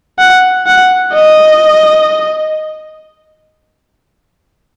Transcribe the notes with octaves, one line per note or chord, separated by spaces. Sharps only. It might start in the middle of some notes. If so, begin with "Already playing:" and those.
F#5
F#5
D#5